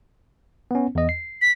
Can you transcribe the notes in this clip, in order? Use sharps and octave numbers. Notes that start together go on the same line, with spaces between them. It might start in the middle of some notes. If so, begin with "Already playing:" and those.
B3 C#4
E2 D#5
C7
B6